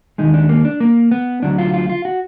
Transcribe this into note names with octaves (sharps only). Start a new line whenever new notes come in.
D#2 D#3 G#3 D#4
D4
A#3
D4
A#3
B3
D2 D3 F#3 D4
F4
F4
F4
F#4